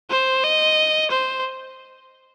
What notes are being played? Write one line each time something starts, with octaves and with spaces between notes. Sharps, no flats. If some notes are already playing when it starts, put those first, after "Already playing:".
C5
D#5
C5